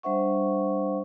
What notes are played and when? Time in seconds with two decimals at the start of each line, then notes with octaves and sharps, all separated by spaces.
0.03 G3 D4 C5 E5 F#5 C#6